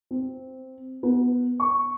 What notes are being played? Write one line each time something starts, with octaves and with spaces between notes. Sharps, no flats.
C4
B3
C#6